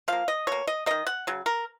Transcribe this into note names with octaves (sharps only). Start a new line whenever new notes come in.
F3 A#3 F5
D#5
B2 A#3 C#5
D#5
D#3 A#3 D#5
F#5
C#3 F#3
A#4